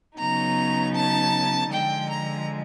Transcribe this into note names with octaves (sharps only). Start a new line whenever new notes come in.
C#3 F#3 B3 D#4 A#5
A5
D3 F3 G#3 G5
A#5